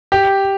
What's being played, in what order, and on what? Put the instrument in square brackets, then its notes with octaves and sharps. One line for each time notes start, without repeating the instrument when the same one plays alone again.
[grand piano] G4